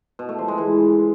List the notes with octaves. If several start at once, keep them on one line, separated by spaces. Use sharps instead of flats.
B2
A3
F3
G#3
E3